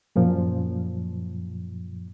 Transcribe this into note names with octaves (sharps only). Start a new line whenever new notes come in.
F#2 A#2 F3